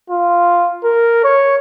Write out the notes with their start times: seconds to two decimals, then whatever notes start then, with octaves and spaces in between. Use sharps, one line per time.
0.10 F4
0.84 A#4
1.25 C#5